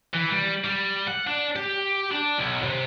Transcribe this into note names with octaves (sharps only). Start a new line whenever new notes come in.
E3
G3
G3
F#5
D4
G4
D4
B1
C3